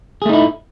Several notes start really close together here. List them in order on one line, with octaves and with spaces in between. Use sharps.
G#4 A3 D#4 E4